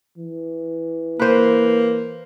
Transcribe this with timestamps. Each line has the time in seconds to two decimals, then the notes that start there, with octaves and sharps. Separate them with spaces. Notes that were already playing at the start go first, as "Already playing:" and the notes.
0.18 E3
1.20 A#3 B4 C5